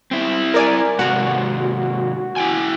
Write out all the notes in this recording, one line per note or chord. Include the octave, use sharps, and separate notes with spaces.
C4 E4
A#4 D5 G#5
G#2 C3 F#4 A#4
E4 G5 G#5